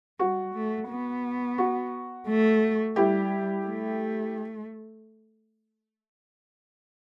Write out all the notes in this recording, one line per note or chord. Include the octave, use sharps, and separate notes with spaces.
G3 F#4
A3
B3
F#4
A3
G3 E4 G4
A3